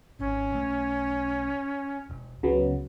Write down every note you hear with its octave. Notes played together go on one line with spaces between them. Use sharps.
G#1 C#4
B1 A3
E1
C#2 C#3 F#3 B3